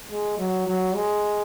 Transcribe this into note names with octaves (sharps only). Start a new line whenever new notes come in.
G#3
F#3
F#3
G#3